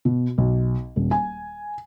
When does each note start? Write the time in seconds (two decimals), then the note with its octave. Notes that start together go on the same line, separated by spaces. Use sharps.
0.05 B2
0.38 B1
0.96 D#1
1.11 G#5